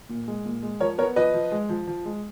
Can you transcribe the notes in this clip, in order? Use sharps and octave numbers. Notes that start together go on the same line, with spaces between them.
A#2
G#3
A#2
G#3
F3 A#4 C#5
B3 A#4 C#5
F3 B4 D#5
F3
G#3
F3
F3
G#3